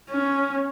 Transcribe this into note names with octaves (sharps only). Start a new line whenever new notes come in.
C#4